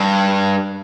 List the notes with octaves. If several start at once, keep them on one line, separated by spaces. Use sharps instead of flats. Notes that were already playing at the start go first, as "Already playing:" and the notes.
Already playing: G2